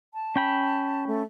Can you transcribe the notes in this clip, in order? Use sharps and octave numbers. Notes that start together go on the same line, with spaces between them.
A5
C#4 G5 B5
A3